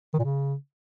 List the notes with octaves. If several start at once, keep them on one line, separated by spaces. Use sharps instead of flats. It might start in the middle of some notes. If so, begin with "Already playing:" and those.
D#3
A#2
C#3